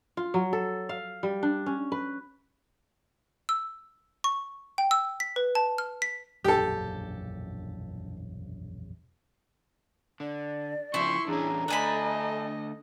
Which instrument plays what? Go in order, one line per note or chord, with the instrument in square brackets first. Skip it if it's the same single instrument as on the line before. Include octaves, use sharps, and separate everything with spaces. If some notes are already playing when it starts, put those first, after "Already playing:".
[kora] F4
F#3
A4
F5
G3
D4
C#4
B4
[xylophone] E6
C#6
G5
E6
B6
B4
A5
F6
B6
[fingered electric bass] E1 A#1 F#2 [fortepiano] G4 A4
[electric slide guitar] D3 [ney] D5
[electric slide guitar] C#3 F3 [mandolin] E4 [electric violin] C6 C#6
[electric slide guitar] E2 C#4 [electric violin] D4 G#4 [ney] A#5
[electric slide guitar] D3 A3 [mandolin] D4 G#5 B5 [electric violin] A4 D#5